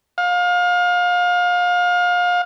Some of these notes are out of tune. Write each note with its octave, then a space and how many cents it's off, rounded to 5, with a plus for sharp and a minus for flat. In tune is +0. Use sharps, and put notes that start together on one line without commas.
F5 +30